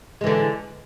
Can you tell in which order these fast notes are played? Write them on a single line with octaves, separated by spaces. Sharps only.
G#3 E3 D3